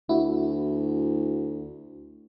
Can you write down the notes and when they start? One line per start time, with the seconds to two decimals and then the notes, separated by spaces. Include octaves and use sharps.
0.09 D2 E4 F#4